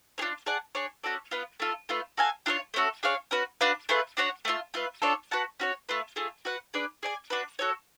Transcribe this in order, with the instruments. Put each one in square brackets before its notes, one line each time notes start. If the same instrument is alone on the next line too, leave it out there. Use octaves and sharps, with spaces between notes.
[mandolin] D4 F4 G#4 C#5
G#4 D5 F#5 A5
D4 G#4 C#5
C#4 F#4 A4 D5
B3 F4 B4
A3 F4 A4
A3 F4 B4
F#4 A4 F5 G#5
D4 F4 A4 C#5
A3 C#4 F#4 A4
D4 G#4 C#5 F5
C#4 F#4 B4
D4 F#4 B4 F5
A3 F4 G#4 B4
D4 F#4 C#5 F#5
A3 D4 F4
A3 F4 B4
D4 F4 A4 C#5
F#4 B4 F#5 A5
C#4 F#4 C#5
A3 F4 B4
A3 F4 G#4
F#4 B4 F#5
D4 G#4 B4 D5
G#4 D5 G#5
D4 F#4 B4
F#4 A4 C#5